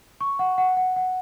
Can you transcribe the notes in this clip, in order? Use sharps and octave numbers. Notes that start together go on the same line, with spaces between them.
C#6
F#5
F#5
F#5
F#5